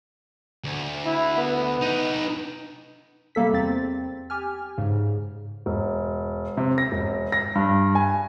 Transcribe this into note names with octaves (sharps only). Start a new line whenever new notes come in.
D2
E4
B3
D#4 B4
C3 G3 A#3 A4 B6
E2 C4 A6
G4 G#5 F6
G#2 C#3
E1
C3
A#6
E1
A#6
G2
G#5